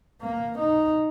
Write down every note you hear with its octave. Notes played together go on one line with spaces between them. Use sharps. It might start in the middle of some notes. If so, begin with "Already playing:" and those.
A#3
D#4